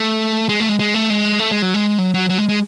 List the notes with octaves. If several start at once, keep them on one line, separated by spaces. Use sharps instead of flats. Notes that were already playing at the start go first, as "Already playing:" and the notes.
Already playing: A3
G#3
A3
G#3
G#3
A3
G#3
A3
G#3
F#3
G#3
F#3
F#3
F#3
G#3
G#3